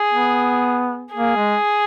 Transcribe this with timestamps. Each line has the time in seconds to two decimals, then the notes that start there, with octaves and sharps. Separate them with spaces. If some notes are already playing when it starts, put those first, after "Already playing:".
Already playing: G#4
0.13 B3
1.15 A#3 G#4
1.36 G#3